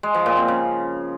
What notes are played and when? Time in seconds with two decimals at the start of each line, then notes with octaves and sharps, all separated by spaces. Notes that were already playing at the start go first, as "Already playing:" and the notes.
0.03 G#3
0.15 F3
0.26 A#2
0.37 C4
0.48 C#3